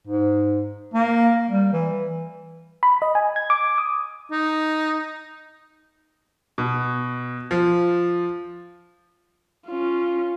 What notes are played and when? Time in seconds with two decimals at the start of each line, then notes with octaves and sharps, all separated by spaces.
0.07 G#2
0.94 A#3
1.49 G3
1.73 E3
2.83 B5
3.02 D#5
3.15 G#5
3.36 G#6
3.50 D6
3.78 D#6
4.31 D#4
6.58 B2
7.51 F3
9.67 C#4 F4